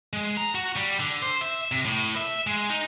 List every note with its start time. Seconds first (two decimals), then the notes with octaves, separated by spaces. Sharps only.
0.13 G#3
0.37 A#5
0.55 F#4
0.76 G3
1.00 D3
1.22 C5
1.41 E5
1.72 C3
1.85 A2
2.16 E5
2.47 G#3
2.70 D#4